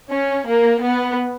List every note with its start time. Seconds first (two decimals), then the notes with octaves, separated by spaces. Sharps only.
0.11 C#4
0.47 A#3
0.82 B3